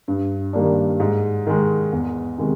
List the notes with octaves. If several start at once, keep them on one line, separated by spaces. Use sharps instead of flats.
G2
D#3 G3 A#3 D4
G#2
D#3 G#3
E2
C3 D#3 G#3